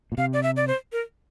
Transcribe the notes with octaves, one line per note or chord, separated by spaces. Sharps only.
A#2
C3 F5
D5
E5
D5
C5
A#4